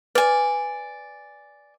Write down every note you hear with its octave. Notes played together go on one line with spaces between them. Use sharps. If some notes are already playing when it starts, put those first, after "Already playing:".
B4 D5 G#5